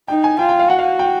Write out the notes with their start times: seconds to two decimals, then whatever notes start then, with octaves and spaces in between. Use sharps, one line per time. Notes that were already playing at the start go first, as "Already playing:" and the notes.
0.08 D#4 G5
0.24 G#5
0.39 F4 G5
0.49 G5
0.59 F5
0.69 F#4 F#5
0.79 F5
0.99 G5